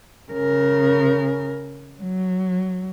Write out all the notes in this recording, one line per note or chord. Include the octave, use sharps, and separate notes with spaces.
C#3 A#4
F#3